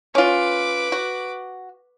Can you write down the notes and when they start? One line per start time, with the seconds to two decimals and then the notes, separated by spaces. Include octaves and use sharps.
0.15 C#4 F4 B4 D6
0.92 F#4